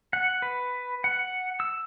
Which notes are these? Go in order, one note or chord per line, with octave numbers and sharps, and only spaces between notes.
F#5
B4
F#5
E6